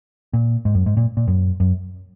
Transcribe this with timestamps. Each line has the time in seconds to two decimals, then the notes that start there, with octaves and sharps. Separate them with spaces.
0.33 A#2
0.65 G#2
0.75 F#2
0.86 G#2
0.97 A#2
1.17 A#2
1.27 F#2
1.60 F#2